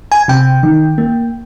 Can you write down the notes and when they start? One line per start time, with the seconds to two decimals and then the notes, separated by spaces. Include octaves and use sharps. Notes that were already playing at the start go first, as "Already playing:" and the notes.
0.12 G#5
0.28 C3 G5
0.63 D#3
0.98 A#3